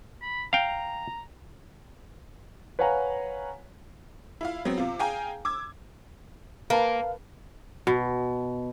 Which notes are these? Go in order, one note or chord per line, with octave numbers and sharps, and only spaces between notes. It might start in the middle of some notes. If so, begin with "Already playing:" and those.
B5
F5 G5 A#5
B4 C#5 F5 F#5 G#5 A#5
E4 F4 F5
F#3 B3 C4
C3 F4
G#4 F5 G5 G#5 A#5
D6 E6 G#6
A#3 A#4 B4 F5 A5
B2